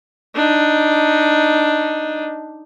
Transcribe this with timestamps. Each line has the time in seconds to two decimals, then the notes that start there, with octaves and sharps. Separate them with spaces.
0.35 D4 D#4